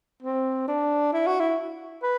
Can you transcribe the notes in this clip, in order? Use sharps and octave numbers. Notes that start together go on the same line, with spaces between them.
C4
D4
E4
F#4
E4
B4